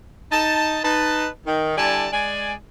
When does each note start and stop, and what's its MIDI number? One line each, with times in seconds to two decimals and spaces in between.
0.32 0.79 63
0.32 0.79 81
0.84 1.28 63
0.84 1.28 71
0.84 1.28 81
1.47 1.77 51
1.78 2.07 50
1.78 2.07 55
1.78 2.07 64
1.78 2.07 74
1.78 2.07 80
1.78 2.07 81
2.12 2.53 56
2.12 2.53 74
2.12 2.53 80